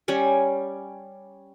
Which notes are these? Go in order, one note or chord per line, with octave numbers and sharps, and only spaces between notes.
G3 C#4 G#5